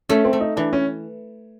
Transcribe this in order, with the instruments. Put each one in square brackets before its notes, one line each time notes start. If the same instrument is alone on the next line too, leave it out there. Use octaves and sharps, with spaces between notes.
[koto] A3 [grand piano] C#4
[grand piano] C4
[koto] A3
[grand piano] D#4
[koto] E3 [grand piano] D4
[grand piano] C#4